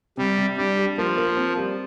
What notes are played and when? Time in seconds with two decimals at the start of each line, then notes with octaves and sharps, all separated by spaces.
0.17 C3 G3
0.38 C3
0.57 G3 D4
0.77 G4
0.97 F3 A#3
1.18 A#3
1.37 C4
1.57 G3